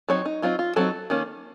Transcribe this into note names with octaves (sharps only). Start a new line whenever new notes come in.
F#3 C4 D#4 C#5
D#4
F#3 C4 D#4 F4
F4
F#3 C4 D#4 A4
D#3 A#3 C#4